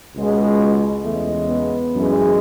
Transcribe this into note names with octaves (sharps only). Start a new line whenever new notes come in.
C#2 B2 G#3
E2 C#3 G#3 A3
B3
F#2 E3 G#3